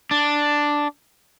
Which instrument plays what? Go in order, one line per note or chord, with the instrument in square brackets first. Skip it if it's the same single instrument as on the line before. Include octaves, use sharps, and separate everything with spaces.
[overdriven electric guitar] D4